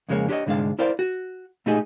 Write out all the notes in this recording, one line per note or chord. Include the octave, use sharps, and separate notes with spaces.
F2 C#3 G#3 A#3 C#5
D4 G4 C5 C#5 D#5
C2 G#2 D3 G#3 D4 F5
E4 A#4 C5 D5 F5
F#4
A#2 A3 D#4 G4 G#4 D#5